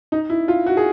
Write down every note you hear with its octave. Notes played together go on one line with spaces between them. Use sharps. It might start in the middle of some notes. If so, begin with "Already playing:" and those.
D#4
E4
F4
F#4
G#4